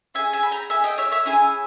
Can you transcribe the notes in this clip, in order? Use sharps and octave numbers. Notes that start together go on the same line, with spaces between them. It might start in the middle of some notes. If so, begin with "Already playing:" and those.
C#4 G#4 E5 G#5
E5 G#5
B5
G5 A#5
E5 G#5
D#5 G5
C#5 E5
C#5 E5
C#4 E4 G#4 E5 G#5